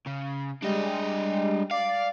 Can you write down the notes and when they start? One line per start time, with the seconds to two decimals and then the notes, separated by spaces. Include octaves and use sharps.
0.06 C#3
0.62 G3 G#3 D4 D#5
1.71 D5 F5